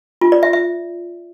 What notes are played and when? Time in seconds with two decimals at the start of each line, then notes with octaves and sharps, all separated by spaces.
0.21 F4
0.32 D5
0.43 E5
0.53 E5